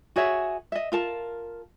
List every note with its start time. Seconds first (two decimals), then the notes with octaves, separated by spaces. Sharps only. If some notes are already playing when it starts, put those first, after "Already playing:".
0.16 F#4 G#4 C#5 E5
0.72 D#5 E5
0.92 F4 A#4 A5